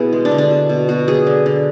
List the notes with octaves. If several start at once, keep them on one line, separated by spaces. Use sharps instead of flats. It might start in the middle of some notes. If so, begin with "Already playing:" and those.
Already playing: B2 B3 E4 G#4
G#3
D4
D3
D4
B2
B2
B3 F#4
F#3 G#4
D3
D3